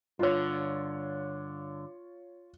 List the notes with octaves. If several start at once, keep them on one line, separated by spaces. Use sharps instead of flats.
G2 D3 F4 C#5